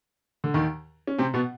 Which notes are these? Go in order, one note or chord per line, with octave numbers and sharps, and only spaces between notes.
D3
D#2 D#3
C#4
C3 C4
B2 B3